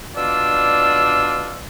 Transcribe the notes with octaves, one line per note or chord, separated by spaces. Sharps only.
B2 D4 F4 D5 E6